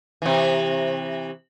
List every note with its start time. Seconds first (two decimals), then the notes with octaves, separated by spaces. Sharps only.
0.22 C3 E3